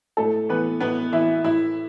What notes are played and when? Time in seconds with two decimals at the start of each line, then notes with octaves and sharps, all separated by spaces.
0.17 A2 A3 A4
0.49 E3 B3 B4
0.80 A2 B3 B4
1.12 E3 E4 E5
1.44 A2 E4 E5